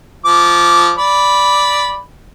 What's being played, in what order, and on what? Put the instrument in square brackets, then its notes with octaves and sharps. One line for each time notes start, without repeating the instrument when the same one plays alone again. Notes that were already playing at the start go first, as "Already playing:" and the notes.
[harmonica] F3 D6
D5 B5